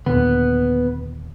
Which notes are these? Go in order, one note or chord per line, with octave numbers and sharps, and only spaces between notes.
D#2 A#2 D3 B3